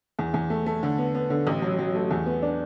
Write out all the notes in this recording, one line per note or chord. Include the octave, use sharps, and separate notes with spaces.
E2
E2
A3
A3
D3
B3
B3
D3
A1
F#3
F#3
A3
E2
B3
D4